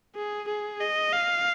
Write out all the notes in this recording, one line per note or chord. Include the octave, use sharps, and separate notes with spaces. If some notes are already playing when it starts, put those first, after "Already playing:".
G#4
G#4
D#5
F5